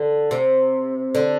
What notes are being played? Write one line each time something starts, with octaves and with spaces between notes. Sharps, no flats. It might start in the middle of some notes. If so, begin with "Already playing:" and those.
Already playing: D3
C3
D3